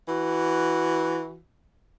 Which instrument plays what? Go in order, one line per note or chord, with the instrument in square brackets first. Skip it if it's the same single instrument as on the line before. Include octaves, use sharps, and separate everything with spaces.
[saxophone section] E3 F#4